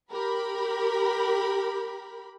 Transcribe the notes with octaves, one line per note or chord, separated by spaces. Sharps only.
G4 A#4 B5